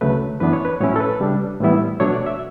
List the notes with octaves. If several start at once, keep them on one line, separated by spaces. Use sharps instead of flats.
D2 C#3 F#3 A3 B4
F#2 E3 B3 D4 B4
C#5
B4
A2 F#3 C#4 E4 C#5
A4
B4
C#3 G3 D4
A2 E3 G3 B3 E4
B2 F#3 A3 D4 C#5
D5
E5